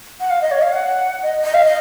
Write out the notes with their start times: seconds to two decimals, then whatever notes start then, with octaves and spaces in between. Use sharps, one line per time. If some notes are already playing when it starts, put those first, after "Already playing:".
0.20 F#5
0.30 F5
0.41 D#5
0.51 C#5
0.62 F5
0.72 F#5
1.23 D#5
1.44 D#5
1.54 F5
1.65 D#5